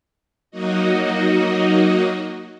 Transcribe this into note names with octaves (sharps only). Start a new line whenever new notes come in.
F#3 A#3 D#4 F#4 D#5